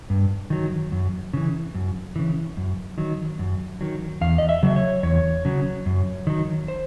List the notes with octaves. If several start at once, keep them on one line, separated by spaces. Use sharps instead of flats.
G2
D#3 F#3
F#2
C#3 E3
F#2
C#3 E3
F#2
D#3 F#3
F#2
D#3 F#3
E2 F5
D#5
E5
C#3 F#3
C#5
E2 C#5
C#3 F#3
F#2
D#3 F#3
C5